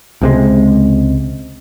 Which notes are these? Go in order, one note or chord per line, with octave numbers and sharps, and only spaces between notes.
C#2 C3 G#3